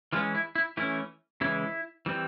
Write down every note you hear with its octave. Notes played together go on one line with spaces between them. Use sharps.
E3 G#3 C#4 F4
E4
E4
E3 A3 C#4 E4
C#3 E3 G#3 E4
E3 G3 C4